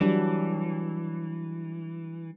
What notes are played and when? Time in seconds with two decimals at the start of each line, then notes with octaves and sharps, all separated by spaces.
0.01 E3 F#3 G3 D4